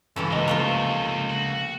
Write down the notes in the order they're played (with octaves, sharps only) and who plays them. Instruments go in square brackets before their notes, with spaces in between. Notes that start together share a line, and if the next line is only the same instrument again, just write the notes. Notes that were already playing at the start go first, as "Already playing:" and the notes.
[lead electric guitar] C#2 [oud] G2 C#4 [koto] C3 E3 A4
[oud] A#3 D#5 [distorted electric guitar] D#4 C5
[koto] F3 A3 F4
[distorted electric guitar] F#4